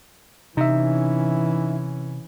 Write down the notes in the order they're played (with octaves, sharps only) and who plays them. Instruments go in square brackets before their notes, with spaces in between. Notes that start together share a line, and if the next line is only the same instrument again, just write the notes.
[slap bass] C3 [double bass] E3 C#4 [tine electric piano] D#4 E5